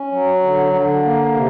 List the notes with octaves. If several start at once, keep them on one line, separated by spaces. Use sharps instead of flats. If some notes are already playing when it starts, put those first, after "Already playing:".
Already playing: C#4
F#3
D3
D3
A#3
C3